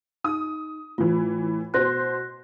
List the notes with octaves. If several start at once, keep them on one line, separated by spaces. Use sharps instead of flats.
D#4 D#6
A2 E3 F4
B2 C5 C6 F#6 A#6